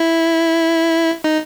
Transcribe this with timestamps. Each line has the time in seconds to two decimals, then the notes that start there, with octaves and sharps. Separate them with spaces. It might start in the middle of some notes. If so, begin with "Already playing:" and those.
Already playing: E4
1.24 D#4